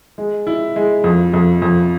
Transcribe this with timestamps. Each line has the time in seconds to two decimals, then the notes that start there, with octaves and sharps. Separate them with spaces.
0.18 G#3
0.47 E4
0.76 G#3
1.04 F2
1.34 F2
1.62 F2